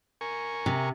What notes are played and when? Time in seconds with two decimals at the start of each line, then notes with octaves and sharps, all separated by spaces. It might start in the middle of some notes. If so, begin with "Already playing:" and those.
0.21 A#4 G#5 C#6
0.66 C3